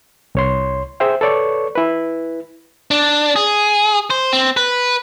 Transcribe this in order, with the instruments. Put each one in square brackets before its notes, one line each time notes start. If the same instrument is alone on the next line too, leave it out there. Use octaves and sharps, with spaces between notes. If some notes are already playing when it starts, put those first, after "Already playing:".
[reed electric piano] C2 C#5 C6
G#4 C5 E5 G5
A4 B4 C#5 D5 C#6
E4 B4
[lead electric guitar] D4
G#4
C5
C4
B4